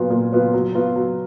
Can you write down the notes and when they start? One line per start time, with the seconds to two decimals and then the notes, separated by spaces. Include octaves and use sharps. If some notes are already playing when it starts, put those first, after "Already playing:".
Already playing: A#2 F#3 B3 F4
0.10 A#2
0.32 F#3 B3 F4
0.54 F#3
0.75 B3 F4
0.96 F#3